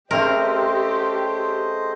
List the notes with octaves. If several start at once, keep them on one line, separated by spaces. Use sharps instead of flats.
C#3 A3 C4 G4 A#4 C5 D#5